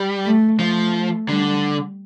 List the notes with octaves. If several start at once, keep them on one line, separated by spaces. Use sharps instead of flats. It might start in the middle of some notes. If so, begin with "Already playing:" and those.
Already playing: G3
A3
F3 A3
D3 G3